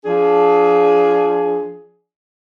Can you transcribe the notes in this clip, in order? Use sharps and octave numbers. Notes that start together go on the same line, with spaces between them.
F3 D4 G#4